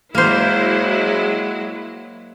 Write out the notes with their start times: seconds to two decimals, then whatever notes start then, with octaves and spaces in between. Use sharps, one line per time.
0.15 F#3 G#3 A#3 E4 C5